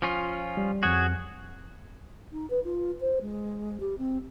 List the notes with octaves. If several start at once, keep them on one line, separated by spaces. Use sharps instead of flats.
F3 C#4 F4
G3
F2 F#4 G#4 C#5 F#6
D#4
B4
F4
C5
G#3
G4
C4